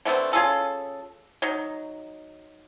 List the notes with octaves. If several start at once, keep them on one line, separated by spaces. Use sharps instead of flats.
D3 A3 B3 C4
C#4 F4 G#4 A4
F#3 D#4